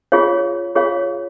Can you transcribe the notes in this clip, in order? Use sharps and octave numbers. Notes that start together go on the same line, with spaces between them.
F4 G#4 C#5 F5
F4 G#4 C#5 F5